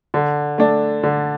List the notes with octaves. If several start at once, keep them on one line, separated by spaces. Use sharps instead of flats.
D3
A3 D4
D3